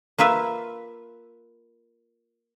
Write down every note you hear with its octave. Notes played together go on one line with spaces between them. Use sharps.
A#3 F4 B4 E5